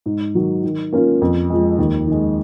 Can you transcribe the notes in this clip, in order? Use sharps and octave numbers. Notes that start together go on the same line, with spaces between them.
G#2
D#3 F#3
D#3
A#3 C#4 F4
F2
F3 G#3
D#2
D#3 G#3